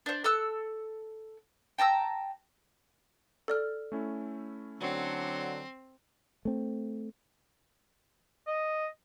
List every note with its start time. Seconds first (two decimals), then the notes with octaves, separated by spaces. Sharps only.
0.06 D4 C5
0.24 A4 A5 E6 F#6
1.78 G5 A5 A#5 E6
3.48 A4 D5 F6
3.92 A3 C#4 E4
4.81 D3 F#3 C4
6.45 A3 C4
8.47 D#5